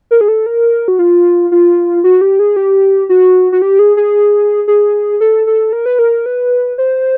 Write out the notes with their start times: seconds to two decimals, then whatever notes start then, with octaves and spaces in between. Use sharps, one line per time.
0.11 A#4
0.21 G#4
0.28 A4
0.46 A#4
0.88 F#4
0.99 F4
1.52 F4
2.04 F#4
2.21 G4
2.39 G#4
2.56 G4
3.09 F#4
3.52 F#4
3.62 G4
3.79 G#4
3.97 G#4
4.68 G#4
5.21 A4
5.47 A4
5.73 A#4
5.86 B4
5.99 A#4
6.26 B4
6.78 C5